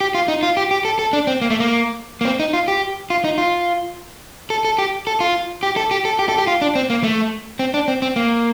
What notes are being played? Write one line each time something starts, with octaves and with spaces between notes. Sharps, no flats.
G4
F4
D#4
F4
G4
G4
A4
A4
D4
C4
A#3
A3
A#3
A#3
C4
D#4
F4
G4
F4
D#4
F4
A4
A4
G4
A4
F4
G4
A4
G4
A4
G4
A4
G4
F4
D4
C4
A#3
A3
C4
D4
C4
C4
A#3